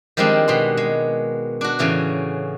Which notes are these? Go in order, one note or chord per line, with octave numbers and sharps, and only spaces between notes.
D#3 F3 G3 G#3 C4 D4
B2 B3 C6
G#3
D4 F#4
A2 C#3 E3 C#4